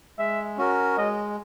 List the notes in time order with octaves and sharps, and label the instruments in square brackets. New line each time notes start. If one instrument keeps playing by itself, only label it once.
[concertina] G#3 [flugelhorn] E5
[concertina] C#4 F#4 A#4
[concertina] G#3 [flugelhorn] D#5